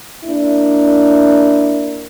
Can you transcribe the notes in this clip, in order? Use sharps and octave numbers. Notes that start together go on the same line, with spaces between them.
A#3 D4 E4